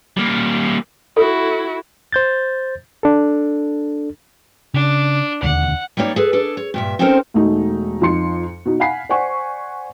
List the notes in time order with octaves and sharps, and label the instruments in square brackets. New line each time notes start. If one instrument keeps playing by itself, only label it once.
[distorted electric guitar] G3 A#3
[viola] E4 F#4 [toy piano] A4
[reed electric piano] C5 G6 A6
D4 A4
[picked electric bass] C#3 [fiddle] D4
[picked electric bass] E1 D#2 D3 [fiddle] F#5
[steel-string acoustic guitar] G3 A#3 D#4 C#5 D5
G#4 A4 B4
D4 G#4 A4
C#5
G2 A#2 E5
C4 C#4 D#4 A4 A#4 C5
[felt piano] E1 A3 D#4
F2 D#4 C6 C#7
B2 D#4
F5 F#5 G#5 B5 B6 C7
C5 D5 F#5 G#5 C#6